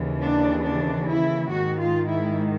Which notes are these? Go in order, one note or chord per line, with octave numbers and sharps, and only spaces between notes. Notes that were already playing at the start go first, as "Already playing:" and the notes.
Already playing: D#2 C#3 E3
D4
D4
E4
G#2 D#3 F#4
F4
E4